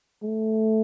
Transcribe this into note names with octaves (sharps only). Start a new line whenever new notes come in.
A3